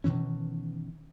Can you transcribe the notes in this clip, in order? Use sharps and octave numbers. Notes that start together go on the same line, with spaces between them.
B2 D#3 E3 C#4